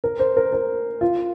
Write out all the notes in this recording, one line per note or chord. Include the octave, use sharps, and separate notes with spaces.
A#4
C5
A#4
A#4
F4